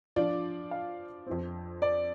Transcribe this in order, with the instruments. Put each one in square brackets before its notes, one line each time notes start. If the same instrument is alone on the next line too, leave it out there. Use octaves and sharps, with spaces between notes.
[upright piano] F3 D4 F4 D5
[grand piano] F5
[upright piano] F2 F3 C4
[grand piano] D5